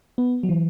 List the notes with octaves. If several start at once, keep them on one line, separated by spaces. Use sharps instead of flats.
B3
F#3
E3